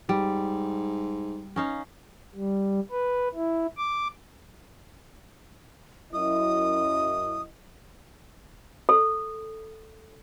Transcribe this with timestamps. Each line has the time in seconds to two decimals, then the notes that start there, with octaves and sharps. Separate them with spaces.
0.09 G#2 G3
1.56 C#4 D#4 F5
2.34 G3
2.91 B4
3.35 E4
3.78 D6
6.13 F#2 E4 D#5 D#6
8.89 A4